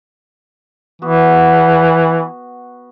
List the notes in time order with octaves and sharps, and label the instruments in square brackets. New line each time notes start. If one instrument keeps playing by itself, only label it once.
[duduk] E3 [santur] B3 F#4